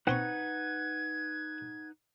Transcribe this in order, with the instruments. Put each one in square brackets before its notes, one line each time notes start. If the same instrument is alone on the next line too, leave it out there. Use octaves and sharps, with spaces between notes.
[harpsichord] C4 C6 C#6 [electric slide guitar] D#4 B4 F#5 [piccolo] G#6